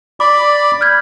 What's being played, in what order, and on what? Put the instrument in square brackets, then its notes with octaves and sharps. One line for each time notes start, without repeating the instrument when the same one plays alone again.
[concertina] D5 B5 [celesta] D6
[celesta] F6 G6 G#6